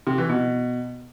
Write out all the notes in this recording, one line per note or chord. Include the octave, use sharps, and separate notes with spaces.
C3
E3
B2